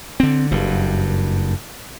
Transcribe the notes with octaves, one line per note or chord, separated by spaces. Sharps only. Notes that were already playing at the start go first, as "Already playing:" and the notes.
D3 C4
F#1 G2